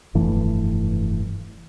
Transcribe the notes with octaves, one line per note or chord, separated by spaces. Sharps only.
F1 G2 E3 A3